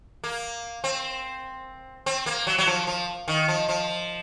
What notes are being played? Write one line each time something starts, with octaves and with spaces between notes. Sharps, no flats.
A#3
C4
C4
A#3
F#3
F#3
F3
F3
D#3
F3
F3